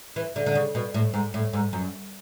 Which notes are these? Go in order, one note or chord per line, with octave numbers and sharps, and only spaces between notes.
E3
D3
D3
C#3
B2
A2
G#2
A2
G#2
F#2